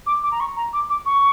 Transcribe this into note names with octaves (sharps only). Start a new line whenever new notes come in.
D6
D6
A#5
C#6
A#5
D6
D6
C#6